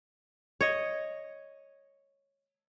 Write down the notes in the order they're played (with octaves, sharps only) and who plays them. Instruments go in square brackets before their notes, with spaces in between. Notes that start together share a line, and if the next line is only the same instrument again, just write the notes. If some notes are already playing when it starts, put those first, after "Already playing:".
[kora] C#5 D#5